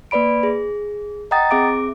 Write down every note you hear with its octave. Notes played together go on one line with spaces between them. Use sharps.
A#3 B4 D5 B5 D7
G#4
D#5 F#5 G5 A#5 D#6 A6
C4 G#4 E5 D6 D7